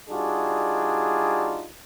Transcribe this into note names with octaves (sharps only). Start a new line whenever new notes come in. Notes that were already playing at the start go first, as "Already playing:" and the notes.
G3 D4 D#4 F4 F#4 G#4